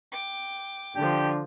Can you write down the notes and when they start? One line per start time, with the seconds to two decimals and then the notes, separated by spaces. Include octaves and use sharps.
0.12 G5 D6
0.96 D3 F3 D4 G4